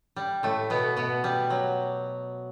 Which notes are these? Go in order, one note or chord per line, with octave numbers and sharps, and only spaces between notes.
G3
A2 A3
B2 B3
B2 B3
G3
F#3